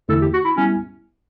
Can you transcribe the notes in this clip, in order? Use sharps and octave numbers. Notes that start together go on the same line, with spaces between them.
E2 D3 A3 E4 A4
G4
F#4
E4
G3 B3 C#4 E4